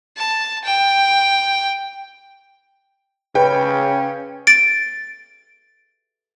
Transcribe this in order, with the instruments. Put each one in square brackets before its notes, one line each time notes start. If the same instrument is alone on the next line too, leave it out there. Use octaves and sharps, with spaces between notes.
[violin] A5
G5
[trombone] C#3 [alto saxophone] C#4 [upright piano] B4 [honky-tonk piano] G5
[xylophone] A6 D7